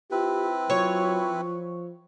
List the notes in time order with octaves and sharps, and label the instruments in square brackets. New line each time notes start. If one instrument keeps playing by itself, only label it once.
[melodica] C4 E4 B4 [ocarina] F4 [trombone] G4
[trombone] F#3 [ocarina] F4 [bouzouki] C#5
[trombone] F3